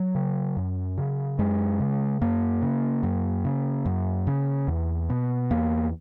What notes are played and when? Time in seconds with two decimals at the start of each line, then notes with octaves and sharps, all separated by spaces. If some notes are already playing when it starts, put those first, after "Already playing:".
Already playing: F#3
0.15 C#3
0.57 F#2
0.98 C#3
1.39 F#2 G#3
1.80 C#3
2.22 F#2 A#3
2.62 C#3
3.03 F#2
3.45 C#3
3.86 F#2
4.27 C#3
4.68 E2
5.10 B2
5.51 E2 A#3